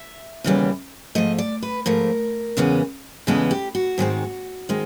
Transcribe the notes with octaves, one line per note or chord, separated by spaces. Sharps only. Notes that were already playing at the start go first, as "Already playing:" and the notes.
Already playing: E5
D#2 C#3 E3 G3 B3
G#2 F3 A3 D#5
D5
B4
G#2 F3 A3 A#4
E2 C#3 E3 G#3 B3
E2 C#3 E3 G#3 B3 A4
G4
F#4
G#2 D#3 G#3 C4
D#3 G#3 C4